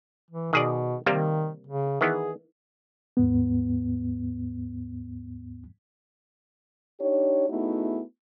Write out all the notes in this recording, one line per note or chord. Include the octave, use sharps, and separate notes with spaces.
E3
B2 D#3 G#4 D5
C3 D#3 G3 A#3
C#3
D#3 E3 B3 G#4
D#2 G#2 B3
D4 D#4 G4 C#5
A3 B3 D#4 E4 F#4 G#4